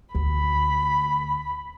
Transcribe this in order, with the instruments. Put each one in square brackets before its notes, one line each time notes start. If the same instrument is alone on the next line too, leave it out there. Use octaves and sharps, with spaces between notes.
[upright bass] D2 [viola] B5